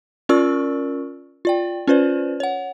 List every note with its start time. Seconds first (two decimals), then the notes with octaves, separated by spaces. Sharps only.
0.29 C#4 F4 A#4 D5 C#6 E6
1.45 F4 D5 G5
1.87 C#4 F4 B4 C5 D5
2.40 C#5 F#5